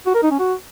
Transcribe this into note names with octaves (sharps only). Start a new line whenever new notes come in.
F#4
A#4
D#4
C#4
F#4